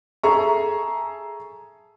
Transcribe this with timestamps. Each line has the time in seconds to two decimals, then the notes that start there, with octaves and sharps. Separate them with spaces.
0.23 G#4 A4 E5 A#5 C#6